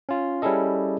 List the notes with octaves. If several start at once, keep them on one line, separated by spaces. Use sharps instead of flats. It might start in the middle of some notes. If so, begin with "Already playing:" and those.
C#4 F4
G3 C#4 E4 G#4 A4 D#5